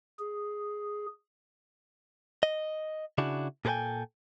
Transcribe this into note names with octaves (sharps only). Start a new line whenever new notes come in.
G#4
D#5
C#3 D4 E4 F#4
A#2 G#4 A4 B4 G5 G#5